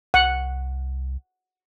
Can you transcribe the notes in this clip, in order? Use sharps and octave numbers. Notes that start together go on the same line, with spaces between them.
C2 F#5